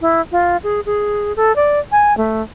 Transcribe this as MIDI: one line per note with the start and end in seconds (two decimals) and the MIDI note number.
0.01 0.21 64
0.32 0.57 65
0.63 0.80 68
0.86 1.35 68
1.36 1.55 69
1.56 1.80 74
1.92 2.16 80
2.18 2.42 57